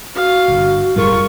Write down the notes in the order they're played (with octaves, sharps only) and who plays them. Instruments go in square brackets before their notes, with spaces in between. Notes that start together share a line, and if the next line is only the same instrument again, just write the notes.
[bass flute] F#4 [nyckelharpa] F5
[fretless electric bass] G1 D3
[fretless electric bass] F1 F#2 A2 [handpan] G3 G#4 A#4 [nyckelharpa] F4 C#6